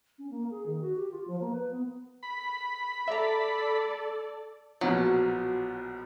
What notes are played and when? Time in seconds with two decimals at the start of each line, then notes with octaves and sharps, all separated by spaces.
0.19 C#4
0.31 A#3
0.51 G#4
0.66 D#3
0.81 F#4
0.96 G4
1.12 F4
1.28 F3
1.41 A#3
1.53 B4
1.71 B3
2.23 B5
3.08 A4 D5 E5 A#5
4.81 A#1 B2 F3 F#3